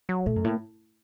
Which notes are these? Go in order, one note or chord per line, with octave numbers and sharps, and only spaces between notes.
F#3
A#2 A3
F#2
A2 A#3